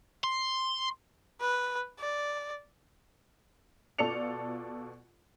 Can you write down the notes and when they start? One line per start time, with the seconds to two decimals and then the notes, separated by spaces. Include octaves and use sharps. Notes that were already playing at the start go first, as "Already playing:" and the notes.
0.24 C6
1.41 B4
2.00 D5
3.99 B2 F4 A4 D5 C#7 F7